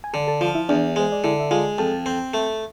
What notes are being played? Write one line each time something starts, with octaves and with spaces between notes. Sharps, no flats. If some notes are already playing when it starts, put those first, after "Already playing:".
G#5
D3 A4 A5
A4 A5
F3 F4 F5
E4 E5
E2 D4 D5
G#3 C5
D5
D3 E4 E5
E5
G#3 F4 F5
F2 A4 A5
C4
A3